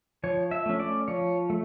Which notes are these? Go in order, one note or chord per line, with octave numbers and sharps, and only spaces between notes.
F3 C#5
E5
A3 C#4
D5
F3 C#5
A3